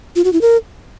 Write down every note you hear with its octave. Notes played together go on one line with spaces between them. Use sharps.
F4
F#4
E4
A#4